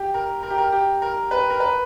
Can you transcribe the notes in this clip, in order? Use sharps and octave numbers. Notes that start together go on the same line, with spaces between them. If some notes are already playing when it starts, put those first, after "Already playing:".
Already playing: G4
A#4
A#4
G4
A#4
G4
A#4
B4
A#4
B4